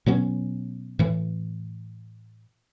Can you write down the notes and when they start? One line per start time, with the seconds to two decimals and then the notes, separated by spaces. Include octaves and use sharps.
0.06 B2 F#3 B3 C#4
0.99 A2 E3